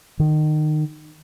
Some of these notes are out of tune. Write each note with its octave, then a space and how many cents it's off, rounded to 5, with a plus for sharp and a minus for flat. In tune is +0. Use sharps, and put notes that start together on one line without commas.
D#3 -25